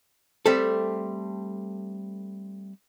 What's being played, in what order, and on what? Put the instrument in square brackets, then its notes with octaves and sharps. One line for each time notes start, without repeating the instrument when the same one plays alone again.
[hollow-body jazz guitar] G3 A3 C4 A4